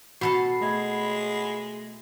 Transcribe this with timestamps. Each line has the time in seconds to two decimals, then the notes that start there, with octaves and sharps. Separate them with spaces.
0.21 B2 F#4 A4 F#5 A5 B5 C7
0.61 G#3 A3 D#5 G#6